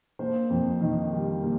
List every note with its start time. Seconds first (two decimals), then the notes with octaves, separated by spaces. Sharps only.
0.19 A#3 C5
0.50 F2
0.81 D#3
1.13 G3
1.43 A#3